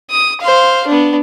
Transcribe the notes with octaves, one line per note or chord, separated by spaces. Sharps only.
D#6
C5 F5
B3 D4